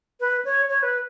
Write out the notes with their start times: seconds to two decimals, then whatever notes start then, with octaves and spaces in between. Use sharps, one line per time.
0.20 B4
0.45 C#5
0.69 C#5
0.83 B4